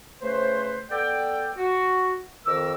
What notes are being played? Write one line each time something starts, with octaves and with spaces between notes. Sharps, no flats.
C#3 A3 B4 C5
B3 A4 D5 G5
F#4
F2 D#3 A#4 D6 E6